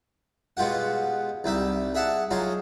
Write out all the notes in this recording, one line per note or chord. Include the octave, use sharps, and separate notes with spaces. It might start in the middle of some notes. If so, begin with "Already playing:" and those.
B2 G#3 F4 G4 F#5
C2 G3 D#4 E5
G#4 E5 F#5 A5
F#3 D#4 F4 G#4